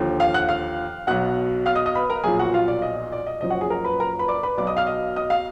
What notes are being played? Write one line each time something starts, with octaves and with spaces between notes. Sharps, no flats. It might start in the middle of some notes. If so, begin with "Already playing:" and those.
Already playing: D#2 D3 F3
F5 F6
F#5 F#6
F5 F6
B1 B2 F#5 F#6
F5 F6
D#5 D#6
D#5 D#6
B4 B5
A#4 A#5
B1 A#2 F3 G#4 G#5
F#4 F#5
F4 F5
D5
D#5
D5
D#5
F#1 F#2 F3 D#5
F#4 F#5
G#4 G#5
A#4 A#5
B4 B5
A#4 A#5
B4 B5
D5 D6
B4 B5
B1 B2 D5 D6
D#5 D#6
F5 F6
D#5 D#6
D#5 D#6
F5 F6